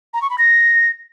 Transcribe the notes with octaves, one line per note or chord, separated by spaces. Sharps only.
A#5
C#6
B5
A#6